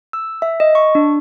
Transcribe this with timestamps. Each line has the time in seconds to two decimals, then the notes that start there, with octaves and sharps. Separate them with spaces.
0.13 E6
0.42 E5
0.60 D#5
0.75 C#6
0.95 D4